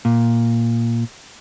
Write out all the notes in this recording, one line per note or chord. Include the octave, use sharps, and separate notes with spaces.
A#2